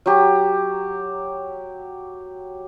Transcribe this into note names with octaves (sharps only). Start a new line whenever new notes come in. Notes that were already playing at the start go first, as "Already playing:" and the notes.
F#3 G4